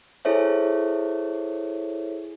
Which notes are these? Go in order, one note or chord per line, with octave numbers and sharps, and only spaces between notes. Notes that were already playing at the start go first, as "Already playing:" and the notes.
E4 G#4 A4 C5 C#5 E5